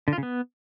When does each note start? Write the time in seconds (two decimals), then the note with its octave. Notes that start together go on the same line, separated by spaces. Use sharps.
0.08 D3
0.13 F4
0.18 C#3
0.23 B3